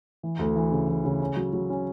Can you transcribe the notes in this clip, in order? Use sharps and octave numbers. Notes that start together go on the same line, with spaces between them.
E3
D2
E3
C#3
E3
C#3
C#4
F#3
F#3
C#4